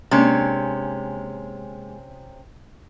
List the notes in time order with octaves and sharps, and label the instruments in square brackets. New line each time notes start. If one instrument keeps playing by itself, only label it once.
[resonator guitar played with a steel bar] C3 C#4 [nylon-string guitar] G#3 A#3 D4